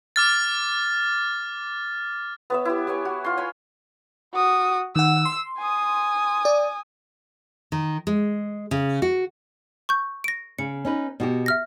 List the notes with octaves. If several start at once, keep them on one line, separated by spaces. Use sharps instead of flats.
D6 F6 A6
B3 C#5 E5
E4 G4
G4 B4 C#5 G#5
F#4
F4 C6
C#5 G#5 B5
F#4 D#6
D#3 F#5 E6
C6
G#5 D#6
D5
D#3
G#3
C#3
F#4
C#6 G6
A#6 D7
C#3 C#7
C#4 D#4 B4
B2 F#4 G4
E5 F6 A#6